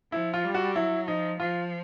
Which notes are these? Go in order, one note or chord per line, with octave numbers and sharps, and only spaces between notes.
F3 E4
F4
G3
F#4
F#3 E4
F3 D#4
F3 F4